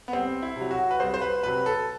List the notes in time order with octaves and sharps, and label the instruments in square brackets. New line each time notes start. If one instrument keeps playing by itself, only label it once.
[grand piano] B3
C2 C4
E4
C3 F#3
F#4
B4
C2 C5
C5
B4
C3 F#3 B4
A4